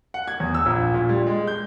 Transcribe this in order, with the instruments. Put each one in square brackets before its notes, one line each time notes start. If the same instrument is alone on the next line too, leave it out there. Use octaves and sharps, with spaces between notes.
[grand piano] F#5
G#6
E2
E6
A#1
A#2
G3
G#3
G6